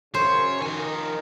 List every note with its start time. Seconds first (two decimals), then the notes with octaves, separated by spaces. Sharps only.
0.14 F#2 C#3 C5 C#5
0.62 D#3 F3 G#5